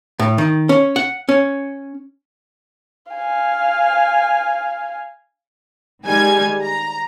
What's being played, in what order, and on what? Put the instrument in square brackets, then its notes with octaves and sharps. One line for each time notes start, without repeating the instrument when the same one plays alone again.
[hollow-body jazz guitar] A2
D#3
C#4
F#5
C#4
[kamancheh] F5 G#5
[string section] D#3 G3 G#3 G#5 G#6
A#5